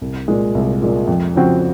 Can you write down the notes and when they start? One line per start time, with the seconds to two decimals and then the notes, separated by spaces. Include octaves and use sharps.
0.01 C2
0.28 A#2 G#3
0.55 C2
0.82 A#2 G#3
1.07 F2
1.35 C#3 F3 C4 F#4